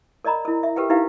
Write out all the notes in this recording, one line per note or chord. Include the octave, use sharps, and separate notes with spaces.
A#4 D5 D#5 A#5 B5
E4 A#4
E5
G4 A#4 B4 F#5 G5
D#4 E4 G4 B4 F5